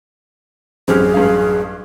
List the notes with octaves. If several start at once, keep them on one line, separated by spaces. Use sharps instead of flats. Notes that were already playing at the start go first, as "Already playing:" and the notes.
A1 F#2 C4 C#4 G4 G#4 F6
G2 C#4 F5